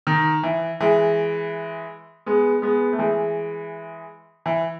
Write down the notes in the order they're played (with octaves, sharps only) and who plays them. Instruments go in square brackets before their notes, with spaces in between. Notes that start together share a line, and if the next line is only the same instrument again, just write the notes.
[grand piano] D#3
E3
E3 G#3
G#3 B3
G#3 B3
A3
E3 G#3
E3